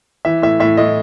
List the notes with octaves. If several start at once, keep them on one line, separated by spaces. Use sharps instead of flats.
E3 E5
A2 E5
A2 E5
A2 D#5